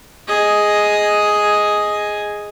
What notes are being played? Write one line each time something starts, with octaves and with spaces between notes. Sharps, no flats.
G#4 D#5